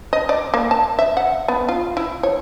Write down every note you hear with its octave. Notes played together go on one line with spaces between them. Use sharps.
D#5
D5
A#3
A5
E5
F#5
B3
F4
E4
C#5